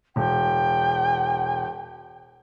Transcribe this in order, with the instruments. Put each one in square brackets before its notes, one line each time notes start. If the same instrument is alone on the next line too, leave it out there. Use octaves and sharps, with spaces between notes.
[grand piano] E1 [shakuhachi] G5